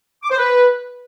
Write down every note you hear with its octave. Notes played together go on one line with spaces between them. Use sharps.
D6
C5
B4